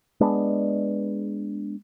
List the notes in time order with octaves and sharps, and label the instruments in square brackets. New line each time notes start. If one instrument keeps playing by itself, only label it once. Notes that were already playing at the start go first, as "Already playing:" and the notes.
[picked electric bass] G#3 B3 D4